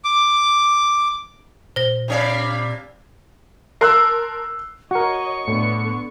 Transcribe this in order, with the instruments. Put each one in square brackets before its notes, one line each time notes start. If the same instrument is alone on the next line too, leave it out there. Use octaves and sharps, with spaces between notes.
[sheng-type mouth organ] D6
[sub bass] A#2 [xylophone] C5 A#6
[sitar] C3 C4 D5 [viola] F5 B5
[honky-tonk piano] A#4 A5 C6 [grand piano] E6 F#6 C7
[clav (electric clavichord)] F#4 A#4 [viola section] C#5 D#5 [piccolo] C#6
[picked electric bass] A2 [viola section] D3 B3